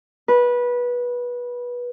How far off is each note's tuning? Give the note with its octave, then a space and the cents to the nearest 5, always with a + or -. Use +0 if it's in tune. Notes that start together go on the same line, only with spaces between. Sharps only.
B4 -20